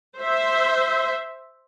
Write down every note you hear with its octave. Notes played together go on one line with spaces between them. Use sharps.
C5 E5